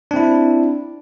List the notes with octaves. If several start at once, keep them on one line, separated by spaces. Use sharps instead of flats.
C4 D4 E4